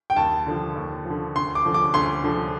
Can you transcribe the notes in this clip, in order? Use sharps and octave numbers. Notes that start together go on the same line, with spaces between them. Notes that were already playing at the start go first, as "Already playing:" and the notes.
G5
D#2 A5
D3 F3
D#2
F3
D3
D2 C6
D6
D3 F3
D6
D2 C6
D3 F3